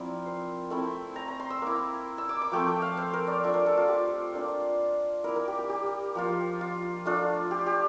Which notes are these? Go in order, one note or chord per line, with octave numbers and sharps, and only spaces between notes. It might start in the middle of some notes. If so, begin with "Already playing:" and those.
Already playing: F3 C4 E4 A#4 C5 D5
C5
A3 C4 E4
A#5
A#5
C6
E6
A#3 E4
E6
D6
D6
F3 A3 C4 G5
G5
F5
C5
A#4
D5
A3 D4 F4 E5
A#4
A4
F4
G4
A#3 D4 F4
A#3 E4 A#4
A#4
G4
G4
G4
F3 A#3 F4
F4
A3 D4 F4
G4
G4